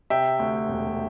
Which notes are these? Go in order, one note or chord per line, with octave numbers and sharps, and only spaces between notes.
C3 E5 G5
D2
E1